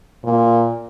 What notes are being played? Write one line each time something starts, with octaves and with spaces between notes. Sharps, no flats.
A#2